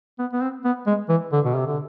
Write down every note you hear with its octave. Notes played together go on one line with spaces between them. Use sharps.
B3
B3
C4
B3
G#3
E3
D3
B2
C3
D3